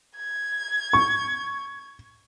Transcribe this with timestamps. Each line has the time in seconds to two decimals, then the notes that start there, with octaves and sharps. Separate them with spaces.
0.16 G#6
0.93 C#6